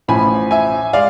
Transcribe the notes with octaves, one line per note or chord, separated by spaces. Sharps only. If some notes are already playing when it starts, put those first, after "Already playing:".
A1 A2 F3 G#5 B5
E5 G#5
G#3 D5 F5